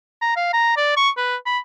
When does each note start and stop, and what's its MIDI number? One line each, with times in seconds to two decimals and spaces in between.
0.22 0.36 82
0.36 0.52 77
0.53 0.73 82
0.77 0.96 74
0.97 1.10 85
1.17 1.36 71
1.46 1.59 83